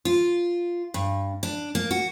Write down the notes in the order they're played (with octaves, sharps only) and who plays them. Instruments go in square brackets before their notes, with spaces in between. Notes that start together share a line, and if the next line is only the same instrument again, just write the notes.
[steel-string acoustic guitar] F4
G2
D4
A#3
F#4